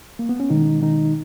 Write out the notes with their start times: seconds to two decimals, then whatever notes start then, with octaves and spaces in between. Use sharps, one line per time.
0.19 A#3
0.29 B3
0.40 C#4
0.50 B2 D#3 G#3 D#4
0.82 D#3 D#4